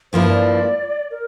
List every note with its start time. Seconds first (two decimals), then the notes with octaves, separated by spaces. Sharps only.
0.13 G2 F3 A#3 E4 C5
0.29 D5
1.11 A#4